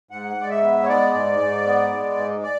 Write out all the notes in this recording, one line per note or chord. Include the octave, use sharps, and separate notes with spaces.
G#2 F#5
G#2 D5
E5
B3
C#5
G#3 D5
G#2
G#2
B3
G#3
G#2
D5